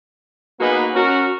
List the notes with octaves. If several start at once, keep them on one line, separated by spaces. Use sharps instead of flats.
A#3 B3 D#4 F#4 G#4 B4
C#4 F#4 A#4